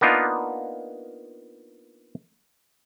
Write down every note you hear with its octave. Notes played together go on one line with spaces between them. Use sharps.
A#3 B3 D4 D#4 F4